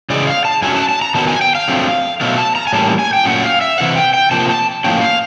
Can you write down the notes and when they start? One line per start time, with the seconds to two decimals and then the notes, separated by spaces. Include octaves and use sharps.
0.10 C#3 E3 G#3 D5
0.27 F5
0.45 A5
0.62 A2 F#3 A3 C#4 G#5
0.76 A5
0.89 A5
1.02 A#5
1.15 D#3 F#3 B3 A5
1.28 G#5
1.41 G5
1.55 F5
1.68 D3 F#3 A3 C4
2.21 B2 F#3 A3 F5
2.38 A5
2.55 A#5
2.67 G#5
2.73 A2 E3 G3 A#3 C#4 A5
2.99 G#5
3.13 G5
3.25 A#2 F#3 A3 C#4 F#5
3.43 F5
3.61 E5
3.78 C3 E3 F#5
3.96 G5
4.14 G5
4.31 C3 F3 A#3 A5
4.49 A5
4.84 A2 F3 A#3 C#4 G5
5.01 F5